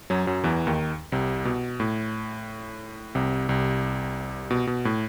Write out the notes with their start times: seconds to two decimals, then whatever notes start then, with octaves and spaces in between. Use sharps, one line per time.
0.10 F#2 F#3
0.27 F#2 F#3
0.44 E2 E3
0.67 D#2 D#3
1.12 C2 C3
1.45 B2
1.80 A2
3.15 C2 C3
3.49 C2 C3
4.51 B2
4.67 B2
4.85 A2